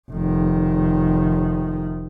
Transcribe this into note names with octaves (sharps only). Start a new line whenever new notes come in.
F1 D#3